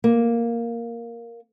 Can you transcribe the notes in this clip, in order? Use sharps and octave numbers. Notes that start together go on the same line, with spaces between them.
A#3